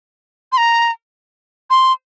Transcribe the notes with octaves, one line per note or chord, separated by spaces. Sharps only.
C6
A#5
C6